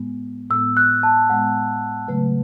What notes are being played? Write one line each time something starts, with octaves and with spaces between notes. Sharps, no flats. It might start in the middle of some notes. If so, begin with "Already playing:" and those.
Already playing: A2 G#3 B3
A2 G#3 B3 E6
F#6
A5
A2 G#3 B3 F#5
C#3 F#3 A3 B4